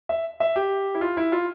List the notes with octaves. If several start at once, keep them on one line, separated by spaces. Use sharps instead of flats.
E5
E5
G4
E4
F4
E4
F4